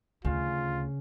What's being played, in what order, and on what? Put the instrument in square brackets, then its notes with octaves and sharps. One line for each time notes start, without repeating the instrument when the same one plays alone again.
[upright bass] D2 [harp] C#3 [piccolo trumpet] F4